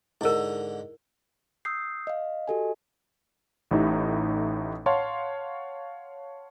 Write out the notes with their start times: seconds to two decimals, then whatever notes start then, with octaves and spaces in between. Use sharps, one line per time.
0.21 G#2 D3 E4 A#4
1.65 D#6 E6 G6 C7
2.07 D#5 F5
2.48 F#4 G4 A4 D#5 G#5
3.71 A1 A2 D#4 G4 E5
4.86 C#5 F5 F#5 A5 C6